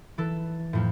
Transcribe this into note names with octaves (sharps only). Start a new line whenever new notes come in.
E3 A4
F2 A2